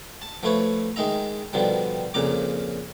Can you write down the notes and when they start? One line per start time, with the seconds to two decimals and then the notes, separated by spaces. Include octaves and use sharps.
0.22 A5
0.43 F3 A3 E4 B4 C#5
0.96 D#3 G#3 D#4 E5 A#5
1.53 B2 D3 D#3 F3 G3
2.14 F2 A#2 C#3 A#5 D6